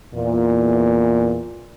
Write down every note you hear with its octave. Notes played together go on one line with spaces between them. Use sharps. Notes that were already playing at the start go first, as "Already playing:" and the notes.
E2 A#2